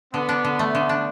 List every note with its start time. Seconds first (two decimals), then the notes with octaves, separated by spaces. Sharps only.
0.13 D3 B3
0.29 D4
0.44 D3
0.59 A3
0.75 D3
0.89 D4